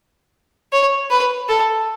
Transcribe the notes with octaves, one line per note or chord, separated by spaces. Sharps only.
C#5
B4
A4